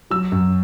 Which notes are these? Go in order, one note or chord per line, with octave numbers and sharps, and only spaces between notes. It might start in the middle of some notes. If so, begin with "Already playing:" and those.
F#3 E6
F#2